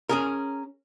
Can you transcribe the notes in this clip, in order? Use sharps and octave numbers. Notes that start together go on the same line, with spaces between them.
C#4 G#4 A#4